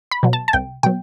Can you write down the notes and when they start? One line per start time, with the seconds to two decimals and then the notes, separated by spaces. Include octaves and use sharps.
0.11 B5
0.23 B2 F#3
0.33 A5
0.48 A5
0.53 C2 G5
0.83 B2 F#3 G5